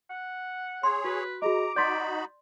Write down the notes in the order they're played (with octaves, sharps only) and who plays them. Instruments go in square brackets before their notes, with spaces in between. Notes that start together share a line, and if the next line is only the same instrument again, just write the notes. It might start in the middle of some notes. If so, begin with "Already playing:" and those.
[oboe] F#5
[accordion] G#4 C#5 [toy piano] C6
[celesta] F#4 [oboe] B4
[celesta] F#4 G#4 D#5 [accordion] A#5 [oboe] D6
[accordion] D#4 F#4 B5 [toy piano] D5 C6 [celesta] G6 A6 B6